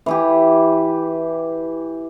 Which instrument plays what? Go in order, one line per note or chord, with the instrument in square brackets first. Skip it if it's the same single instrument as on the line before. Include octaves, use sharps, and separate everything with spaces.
[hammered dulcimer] E3 E4 G4